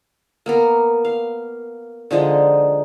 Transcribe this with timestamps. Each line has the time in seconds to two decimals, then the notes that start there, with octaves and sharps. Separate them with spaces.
0.46 A#3 B3 A#4
1.05 F5
2.11 D3 F3 G#3 D#4